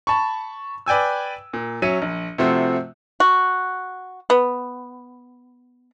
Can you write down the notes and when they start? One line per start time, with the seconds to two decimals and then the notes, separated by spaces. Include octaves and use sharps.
0.07 A5 B5 C#6
0.86 B4 D5 G5 G#5 E6
1.53 A#2
1.82 F#3 C#4 E5 C#7 D#7
2.02 A#1
2.38 C3 F3 A3 C4 F#4
3.20 F#4
4.30 B3